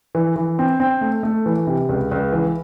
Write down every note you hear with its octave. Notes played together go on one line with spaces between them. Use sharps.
E3
E3
C4
C4
A3
A3
E3
C3
C#2
C#2
E3